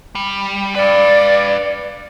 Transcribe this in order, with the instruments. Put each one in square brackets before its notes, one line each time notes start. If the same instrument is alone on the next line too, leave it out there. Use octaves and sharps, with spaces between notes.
[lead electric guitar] G3
[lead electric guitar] B4 F5 [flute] D5